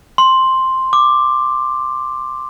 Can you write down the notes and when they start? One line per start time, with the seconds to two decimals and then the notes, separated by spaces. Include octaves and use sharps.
0.18 C6
0.93 D6